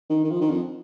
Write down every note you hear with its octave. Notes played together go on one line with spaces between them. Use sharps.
D#3
D#3
F3
D#3
F2